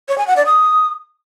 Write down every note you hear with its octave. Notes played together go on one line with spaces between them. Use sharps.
C#5
G#5
F#5
D5
D#6